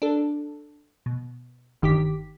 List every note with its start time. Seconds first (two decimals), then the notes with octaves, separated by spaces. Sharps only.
0.02 D4 A4
1.06 B2
1.82 G1 D#3 G4 D6 B6